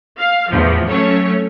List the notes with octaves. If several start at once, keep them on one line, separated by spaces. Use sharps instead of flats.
F5
E2 A2 F3
F#3 A3 C#4 C#5